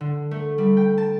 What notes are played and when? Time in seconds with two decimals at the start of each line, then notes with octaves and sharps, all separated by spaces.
0.01 D3
0.31 A3
0.58 G3
0.77 G5
0.98 A5